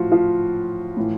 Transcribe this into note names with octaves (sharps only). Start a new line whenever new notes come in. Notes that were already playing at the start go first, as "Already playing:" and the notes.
Already playing: A2 E3 F3 F4 F#4
F3 F4
A2 E3